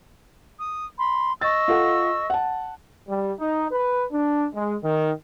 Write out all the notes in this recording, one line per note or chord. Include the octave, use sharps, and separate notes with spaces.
D#6
B5 C6
D#5 C#6 E6 A6
F4 A4 F#5
F#5 A5
G3
D#4
B4
D4
G#3
D#3